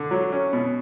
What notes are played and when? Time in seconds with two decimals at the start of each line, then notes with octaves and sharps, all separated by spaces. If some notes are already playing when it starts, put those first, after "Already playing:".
Already playing: D3
0.11 F#3
0.32 C#4
0.53 B2